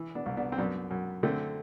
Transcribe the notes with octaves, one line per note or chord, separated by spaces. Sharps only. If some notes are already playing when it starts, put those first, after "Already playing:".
Already playing: E3
B3 D4
C2
B3 D4
C4
F#2 B3 D4
F#2
D3 A3 C4